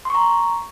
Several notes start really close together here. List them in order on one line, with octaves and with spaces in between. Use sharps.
C6 C#6 A#5